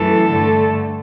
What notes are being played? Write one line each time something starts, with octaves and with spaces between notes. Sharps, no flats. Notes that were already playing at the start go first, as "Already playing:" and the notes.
Already playing: F#2 E3 A3 A4
G2 D3 A3